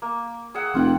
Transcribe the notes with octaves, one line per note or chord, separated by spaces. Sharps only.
A#3
G#4 E5 F#5
F1 F4 F#5 G5